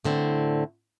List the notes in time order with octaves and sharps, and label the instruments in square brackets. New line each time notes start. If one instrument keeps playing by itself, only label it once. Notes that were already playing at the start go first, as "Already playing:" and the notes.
[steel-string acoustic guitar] A2 D3 C4